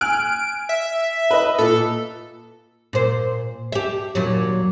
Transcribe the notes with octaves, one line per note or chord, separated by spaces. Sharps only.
G#5 F6 F#6 D7
E5
B4 D#5
A#2 A4
A#2 C5
G4 E5
D#2 A#2 F#3